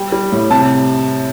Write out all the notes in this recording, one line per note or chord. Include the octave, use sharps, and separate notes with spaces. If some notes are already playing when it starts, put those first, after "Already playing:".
Already playing: G3 G5
G3
A2
C3 A5